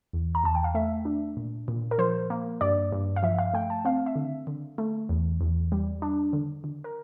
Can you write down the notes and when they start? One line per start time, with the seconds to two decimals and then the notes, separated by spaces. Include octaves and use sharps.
0.13 E2
0.35 A#5
0.44 E2 A5
0.55 G5
0.64 F5
0.74 A3 E5
1.05 D4
1.37 A#2
1.68 A#2
1.91 A#4
1.98 F3 C5
2.30 A#3
2.61 G2 D5
2.92 G2
3.16 F5
3.23 F3 E5
3.39 F5
3.54 A3 G5
3.70 A5
3.85 C4 F5
4.06 E5
4.16 D3
4.47 D3
4.78 A3
5.09 E2
5.41 E2
5.72 G3
6.02 D4
6.33 D3
6.64 D3
6.84 A#4